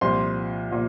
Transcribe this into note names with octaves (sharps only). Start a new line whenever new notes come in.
C2 A#2 F3 C6
A#2 F3